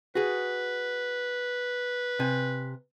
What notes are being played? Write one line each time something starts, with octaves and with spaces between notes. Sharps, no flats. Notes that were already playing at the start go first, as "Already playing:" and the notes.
F#4 G#4 B4
C3 G#5